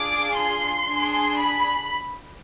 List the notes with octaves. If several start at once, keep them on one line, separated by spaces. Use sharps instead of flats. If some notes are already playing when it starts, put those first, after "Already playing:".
Already playing: D4 F4 G#4 D6
C6
D4 G#4
B5